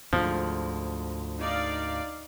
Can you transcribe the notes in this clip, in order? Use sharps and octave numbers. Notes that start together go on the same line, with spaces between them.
D2 G#2 F3
D#4 D5 F5